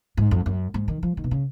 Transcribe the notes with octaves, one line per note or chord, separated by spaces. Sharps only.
G#2
F2
F#2
G#2
D#3
F3
D#3
B2
C#3